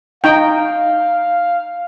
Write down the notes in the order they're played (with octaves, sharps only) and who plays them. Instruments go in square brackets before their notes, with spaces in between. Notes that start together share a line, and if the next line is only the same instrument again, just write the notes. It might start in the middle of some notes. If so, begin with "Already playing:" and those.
[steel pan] D#4 G5 [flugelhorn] F5